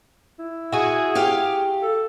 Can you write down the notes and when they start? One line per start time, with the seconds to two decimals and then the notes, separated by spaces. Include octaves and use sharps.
0.39 E4
0.72 F#4 G#4
1.15 G4 F5
1.83 A4